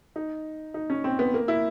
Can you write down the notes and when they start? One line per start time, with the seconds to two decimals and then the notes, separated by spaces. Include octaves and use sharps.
0.16 D#4
0.74 D#4
0.90 C#4
1.04 C4
1.19 B3
1.34 A#3
1.48 E4